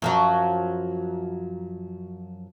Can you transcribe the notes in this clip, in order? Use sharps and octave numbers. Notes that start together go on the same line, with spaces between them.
F#2 F3 F#3